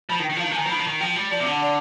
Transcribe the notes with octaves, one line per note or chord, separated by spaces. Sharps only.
F3 B5
D#3
G5
D#3
F3
F5
D#3
F3
G#5
D#3
F3
D#3 B5
F3
D#3
F3 G5
G3
F3 D5
C3
D3
D5